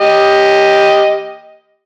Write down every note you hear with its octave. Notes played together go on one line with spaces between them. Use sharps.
G4 D#5